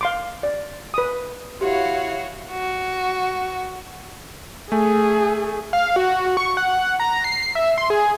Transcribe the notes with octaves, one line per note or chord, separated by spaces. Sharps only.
F5 C6 D6
D5
B4 D#6
E4 F#4 G4 C#5 F5
F#4
A3 G#4 G#5
F5
F#4
C#6
F#5
A#5
C7
E5
C6
G#4